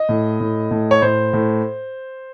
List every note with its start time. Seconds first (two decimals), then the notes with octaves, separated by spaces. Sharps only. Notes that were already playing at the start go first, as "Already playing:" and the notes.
Already playing: D#5
0.09 A2
0.40 A2
0.71 A2
0.91 C#5
1.02 A2 C5
1.33 A2